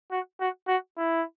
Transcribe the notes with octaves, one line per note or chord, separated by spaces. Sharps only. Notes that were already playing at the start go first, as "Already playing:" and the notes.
F#4
F#4
F#4
E4